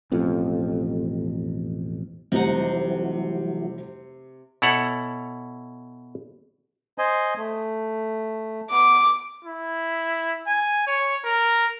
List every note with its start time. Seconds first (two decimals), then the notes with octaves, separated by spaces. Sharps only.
0.12 E1 A1 F2
2.32 F1 C3 E3 F#3 G3 D#4 F#5
4.62 B2 E4 A4 C#5 F#5
6.98 C5 D#5 G#5
7.37 A3
8.71 B3 D6
9.44 E4
10.47 G#5
10.87 C#5
11.24 A#4